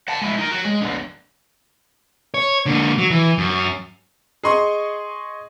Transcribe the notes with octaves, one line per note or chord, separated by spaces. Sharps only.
F#5 A5
G#3 E4
D#4 A#4
F#4 C#5
G#3
B1 D3
C#5
D3 A#3
F#3
E3
F#2
G#4 D#5 C6 C#6 D#6